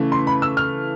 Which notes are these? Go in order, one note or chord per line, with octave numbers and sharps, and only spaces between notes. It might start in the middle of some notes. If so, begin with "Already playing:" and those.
Already playing: C#3 E3 A3
C6
B5
E6
F6